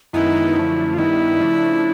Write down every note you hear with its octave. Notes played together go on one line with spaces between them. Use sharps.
F#2 D#3 G#3 B3 D#4 E4
F#2 D3 F3 A3
F4
G2 D#3 G3 B3 D#4 E4
C#3 F3 A3 D4